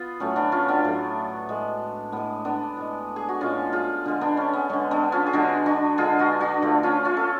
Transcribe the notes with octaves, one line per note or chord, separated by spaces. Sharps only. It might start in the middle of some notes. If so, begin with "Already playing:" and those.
Already playing: B3 F4
A2 F#3 A3 C#4
B3 D4
C#4 F4
B3 D4
A2 F#3 A3
A2 G#3
A2 G#3 B3
B3 D4
A2 G#3
G#4
F#4
A2 G#3 C#4 F4
F4 G#4
D3 G#3
B3 D4
C#4
B3
D3 G#3 C#4
B3 D4
C#4 F4
G#4
D3 G#3 D4 F#4
D4 F#4
D3 G#3 F4 G#4
D4 F#4
D4 F#4
D3 F3 A3
C#4 F4
C#4 F4
A4